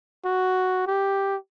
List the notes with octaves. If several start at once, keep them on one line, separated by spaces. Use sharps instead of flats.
F#4
G4